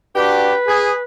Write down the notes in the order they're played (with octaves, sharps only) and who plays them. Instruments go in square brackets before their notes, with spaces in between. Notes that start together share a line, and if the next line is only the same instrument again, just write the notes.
[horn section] D4 F#4 G4 [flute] B4
[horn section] G#4